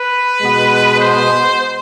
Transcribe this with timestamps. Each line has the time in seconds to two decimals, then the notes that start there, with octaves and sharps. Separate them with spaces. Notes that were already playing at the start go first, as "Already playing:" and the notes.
Already playing: B4
0.40 B2 G#3 B3
0.99 C5